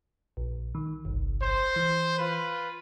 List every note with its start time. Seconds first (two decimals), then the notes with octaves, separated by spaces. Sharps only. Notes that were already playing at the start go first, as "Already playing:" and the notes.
0.37 A#1
0.75 D#3
1.05 G1 C2
1.42 C5
1.76 E3
2.18 F4 B4